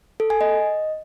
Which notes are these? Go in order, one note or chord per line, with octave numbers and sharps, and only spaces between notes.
A4
G#5
D#5